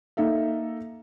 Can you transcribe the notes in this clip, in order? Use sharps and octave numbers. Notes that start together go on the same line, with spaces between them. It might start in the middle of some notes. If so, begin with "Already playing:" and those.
A#3 D#4 A4 E5